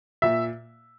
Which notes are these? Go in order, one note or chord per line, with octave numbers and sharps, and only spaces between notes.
A#2 E5